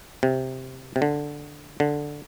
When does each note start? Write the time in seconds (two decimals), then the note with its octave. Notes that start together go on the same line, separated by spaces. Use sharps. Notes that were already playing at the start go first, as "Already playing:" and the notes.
0.23 C3
0.96 C3
1.02 D3
1.80 D3